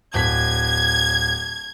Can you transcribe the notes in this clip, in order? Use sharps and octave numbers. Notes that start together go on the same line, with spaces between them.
D1 G#6 B6